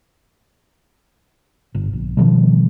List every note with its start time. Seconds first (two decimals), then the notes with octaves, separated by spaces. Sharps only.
1.74 G1
1.93 A#1
2.17 B2 D#3 F3 G3